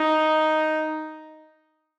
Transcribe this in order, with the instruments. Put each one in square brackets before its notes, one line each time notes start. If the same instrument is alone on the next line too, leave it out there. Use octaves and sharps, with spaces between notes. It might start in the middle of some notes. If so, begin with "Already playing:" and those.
Already playing: [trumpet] D#4